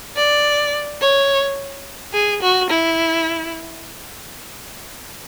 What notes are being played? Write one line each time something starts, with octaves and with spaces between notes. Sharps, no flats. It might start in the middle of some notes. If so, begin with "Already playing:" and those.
D5
C#5
G#4
F#4
E4